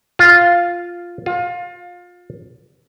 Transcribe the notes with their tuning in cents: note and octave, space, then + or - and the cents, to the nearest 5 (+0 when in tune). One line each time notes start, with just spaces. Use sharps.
F4 +0
F4 +25